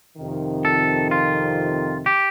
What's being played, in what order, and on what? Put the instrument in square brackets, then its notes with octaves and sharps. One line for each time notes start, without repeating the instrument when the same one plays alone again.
[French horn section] F2 C3 D#3
[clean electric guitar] A4
F4
G4